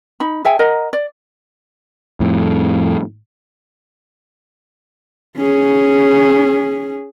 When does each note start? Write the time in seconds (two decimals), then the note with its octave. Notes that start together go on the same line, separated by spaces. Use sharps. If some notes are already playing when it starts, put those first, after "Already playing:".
0.20 D#4 B5
0.45 G#4 E5 G5 G#5
0.59 A#4 D#5 F#5 A#5
0.93 D5
2.20 F2 A2
5.37 C#4 G#4